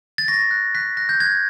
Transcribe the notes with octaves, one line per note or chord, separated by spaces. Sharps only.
A6
C#6 A#6
F#6
F#6 B6
F#6 A#6
G6
F#6 G#6